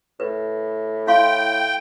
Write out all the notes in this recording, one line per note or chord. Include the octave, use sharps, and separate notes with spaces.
A2 B4
E4 F5 G5 C6